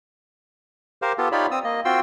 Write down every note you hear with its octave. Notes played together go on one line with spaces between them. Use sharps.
G4 A#4 C5 F5
B3 F4 G4 A4
D#4 F4 G4 C#5 D5 B5
C4 D#6 E6
A#3 D#5
C4 F4 F#4 G5 C6 E6